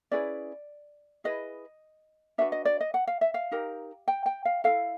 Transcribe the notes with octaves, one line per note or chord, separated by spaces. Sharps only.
C#4 E4 G#4 B4 D5
E4 G#4 B4 D#5
D4 F#4 B4 E5
D#5
D5
D#5
F#5
F5
E5
F5
D#4 G4 A#4
G5
G5
F5
E4 A4 F5